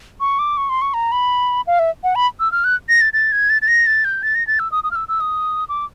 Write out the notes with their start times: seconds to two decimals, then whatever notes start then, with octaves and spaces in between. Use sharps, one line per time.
0.20 C#6
0.39 D6
0.57 C#6
0.69 C6
0.82 C#6
0.94 A#5
1.12 B5
1.67 F5
1.79 E5
2.04 F#5
2.15 B5
2.40 E6
2.52 F6
2.64 F#6
2.89 A#6
3.01 A6
3.13 A6
3.32 G#6
3.50 A6
3.62 A6
3.68 A#6
3.87 A6
4.05 G6
4.23 A6
4.35 A#6
4.47 A6
4.59 E6
4.72 D#6
4.84 D#6
4.91 F6
4.96 E6
5.08 E6
5.21 D#6
5.69 D6